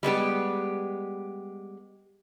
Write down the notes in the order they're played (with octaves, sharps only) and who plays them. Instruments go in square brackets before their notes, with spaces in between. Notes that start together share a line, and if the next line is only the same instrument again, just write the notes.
[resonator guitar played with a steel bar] G3 G#3 B3 G4